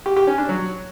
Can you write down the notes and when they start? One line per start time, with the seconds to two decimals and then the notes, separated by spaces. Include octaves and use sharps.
0.06 G4
0.16 G4
0.27 C#4
0.38 D4
0.49 F#3